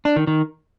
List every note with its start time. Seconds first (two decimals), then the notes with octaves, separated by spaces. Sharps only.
0.05 D4
0.16 D#3
0.27 D#3